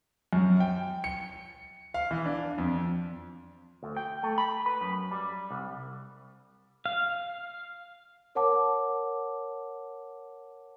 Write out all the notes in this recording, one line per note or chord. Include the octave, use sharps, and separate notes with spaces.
F#2
G5
C#7
F5
E3
D4
F2
D2
G5
A3
B5
B4
F#2
G3
C2
F5
A#4 C#5 F#5 A5 D6